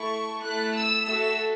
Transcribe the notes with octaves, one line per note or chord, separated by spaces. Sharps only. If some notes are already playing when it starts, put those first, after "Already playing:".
Already playing: A3 E4 A4 C#6
A3 E4 A4 F#6
E6
A3 F#4 A4 E6